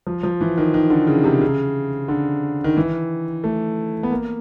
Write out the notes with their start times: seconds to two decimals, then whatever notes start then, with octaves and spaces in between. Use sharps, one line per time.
0.07 F3
0.23 F3
0.41 E3
0.58 D#3
0.74 D#3
0.90 D3
1.07 C#3
1.24 C3
1.41 C#3
2.08 D3
2.64 D#3
2.77 E3
3.44 A3
4.03 B3
4.11 A#3